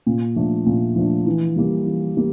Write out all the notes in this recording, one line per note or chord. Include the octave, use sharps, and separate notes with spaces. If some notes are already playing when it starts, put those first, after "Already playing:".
A#2
F3 A3 D4
A#2
F3 A3 D4
E3
G3 A#3
E3
G3 A#3